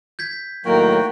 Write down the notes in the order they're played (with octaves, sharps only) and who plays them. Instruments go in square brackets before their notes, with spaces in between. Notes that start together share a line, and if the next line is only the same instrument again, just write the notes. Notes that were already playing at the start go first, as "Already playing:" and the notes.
[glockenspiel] G6 G#6 B6
[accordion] A2 D#3 F#3 [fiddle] A#3 [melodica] F#4 G5